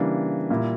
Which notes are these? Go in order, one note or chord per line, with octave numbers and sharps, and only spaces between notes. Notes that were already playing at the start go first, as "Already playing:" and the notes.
Already playing: C#3 E3 G3 A#3 D4
A#2 G3 A#3 E4